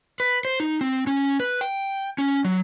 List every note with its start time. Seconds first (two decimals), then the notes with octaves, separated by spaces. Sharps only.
0.20 B4
0.45 C5
0.60 D#4
0.81 C4
1.07 C#4
1.40 B4
1.61 G5
2.18 C#4
2.45 F#3